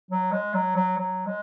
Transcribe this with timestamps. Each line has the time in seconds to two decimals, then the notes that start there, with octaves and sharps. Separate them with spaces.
0.11 F#3
0.32 G#3
0.54 F#3
0.76 F#3
0.98 F#3
1.27 G#3